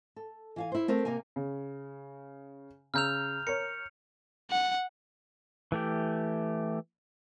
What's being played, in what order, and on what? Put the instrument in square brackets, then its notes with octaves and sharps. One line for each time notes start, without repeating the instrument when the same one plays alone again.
[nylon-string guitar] A4
E3 F5 G#5
E4 C5
A3 C4 A#4
C3 A#3 A#4 G#5
[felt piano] C#3
[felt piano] C#3 A#5 E6 [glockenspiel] F6 G6 F7
[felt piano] A#4 C#5 [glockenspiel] C#7
[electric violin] F#5
[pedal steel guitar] E3 A3 G4